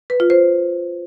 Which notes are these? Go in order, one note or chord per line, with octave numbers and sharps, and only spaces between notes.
B4
F4
C5